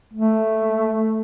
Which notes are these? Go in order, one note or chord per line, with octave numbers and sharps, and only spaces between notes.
A3